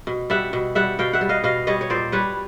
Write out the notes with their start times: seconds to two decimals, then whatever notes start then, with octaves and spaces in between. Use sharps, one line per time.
0.07 B2
0.30 G3 E5 F#5
0.53 B2
0.75 G3 E5 F#5
0.99 B2 F5 G5
1.13 E5 F#5
1.21 G3
1.29 D#5 F5
1.44 B2 D#5 F5
1.67 G3 C#5 D#5
1.81 C#5
1.90 A#2 C5 D5
2.12 G3 B4 C#5